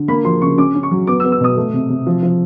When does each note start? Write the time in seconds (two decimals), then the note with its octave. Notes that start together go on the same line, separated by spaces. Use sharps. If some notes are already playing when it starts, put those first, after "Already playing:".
Already playing: D3
0.08 A#3 B5
0.25 F3 C6
0.42 C#3 C#6
0.58 C#4 D6
0.75 C#4
0.83 C#6
0.91 F#3
1.07 B3 D6
1.20 E6
1.24 B3
1.32 E6
1.40 B2 D#6
1.57 A3
1.73 C3
1.89 C3
2.07 F3
2.23 F3